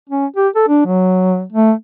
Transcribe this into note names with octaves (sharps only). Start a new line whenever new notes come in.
C#4
G4
A4
D4
F#3
A3